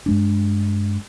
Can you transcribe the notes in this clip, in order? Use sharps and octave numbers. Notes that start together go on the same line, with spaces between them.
G2 G#3 D4